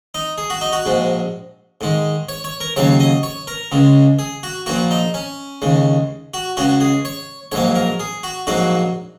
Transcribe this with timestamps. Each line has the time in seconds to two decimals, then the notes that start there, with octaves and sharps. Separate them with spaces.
0.15 D#4
0.38 G#4
0.50 F#4
0.61 D#4
0.73 F#4
0.86 A#1 G#2 G#3
1.81 G#2 D#3 G#3
2.29 C#5
2.44 C#5
2.60 A#4
2.76 D#2 C#3 F#3 A#3 C#5
3.00 D#5
3.23 C#5
3.47 A#4
3.72 C#2 C#3 G#3
4.19 G#4
4.43 F#4
4.66 A#1 A#2 A#3 F#4
4.91 D#4
5.14 C#4
5.62 D#2 C#3 G#3
6.34 F#4
6.57 C#2 C#3 G#3 F#4
6.81 G#4
7.05 C#5
7.52 A#1 G#2 F#3 A#3 C#5
7.75 A#4
8.00 G#4
8.23 F#4
8.47 A#1 G#2 F#3 A#3 F#4